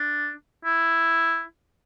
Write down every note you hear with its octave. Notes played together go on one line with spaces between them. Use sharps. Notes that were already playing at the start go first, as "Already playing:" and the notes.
Already playing: D4
E4